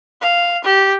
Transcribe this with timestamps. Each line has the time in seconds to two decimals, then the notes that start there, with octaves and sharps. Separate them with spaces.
0.22 F5
0.65 G4